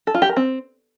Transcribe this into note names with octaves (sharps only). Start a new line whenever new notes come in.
A4
F4
G4
A#4
C4